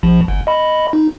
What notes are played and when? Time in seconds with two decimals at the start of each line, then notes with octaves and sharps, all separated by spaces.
0.03 A#1 F3
0.28 G1
0.47 D#5 B5
0.93 D#4